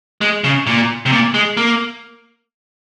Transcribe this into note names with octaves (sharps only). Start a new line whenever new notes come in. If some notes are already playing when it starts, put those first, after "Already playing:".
G#3
C#3
A#2
C3
A#2
G#3
A#3